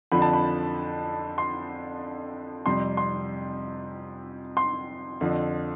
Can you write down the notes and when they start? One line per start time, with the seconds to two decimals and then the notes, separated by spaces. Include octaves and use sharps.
0.12 F2 D3 F3 B5
0.22 A5
0.33 B5
1.38 C6
2.66 F2 C3 G3 C6
2.97 C6
4.57 C6
5.21 F2 D3 F3